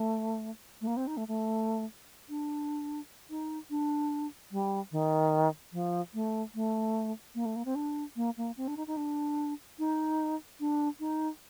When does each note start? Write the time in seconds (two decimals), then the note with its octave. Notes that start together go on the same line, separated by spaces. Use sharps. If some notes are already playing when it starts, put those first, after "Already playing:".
Already playing: A3
0.81 A3
0.87 A#3
0.97 C4
1.07 D#4
1.17 A3
1.28 A3
2.29 D4
3.30 D#4
3.70 D4
4.51 G3
4.92 D#3
5.73 F3
6.14 A3
6.55 A3
7.35 A#3
7.45 A3
7.56 A#3
7.65 C4
7.75 D4
8.16 A#3
8.37 A#3
8.57 C4
8.68 D4
8.77 D#4
8.87 D#4
8.97 D4
9.79 D#4
10.60 D4
11.00 D#4